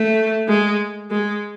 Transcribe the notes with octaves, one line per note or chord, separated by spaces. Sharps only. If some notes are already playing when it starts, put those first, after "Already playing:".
Already playing: A3
G#3
G#3